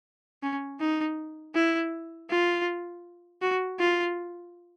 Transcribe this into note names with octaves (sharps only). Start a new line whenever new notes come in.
C#4
D#4
E4
F4
F#4
F4